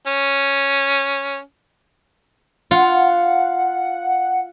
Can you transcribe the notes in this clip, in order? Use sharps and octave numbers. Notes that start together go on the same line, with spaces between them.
C#4
F4 F#5